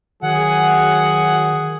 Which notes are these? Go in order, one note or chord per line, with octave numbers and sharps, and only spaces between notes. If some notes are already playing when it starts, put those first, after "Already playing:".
D#3 F#3 G#4 F#5